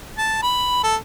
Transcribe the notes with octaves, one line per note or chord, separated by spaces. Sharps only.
A5
B5
A4